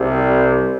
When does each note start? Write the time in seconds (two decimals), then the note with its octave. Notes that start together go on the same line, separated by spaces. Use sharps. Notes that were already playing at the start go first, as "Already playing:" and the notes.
Already playing: C2 C3 G3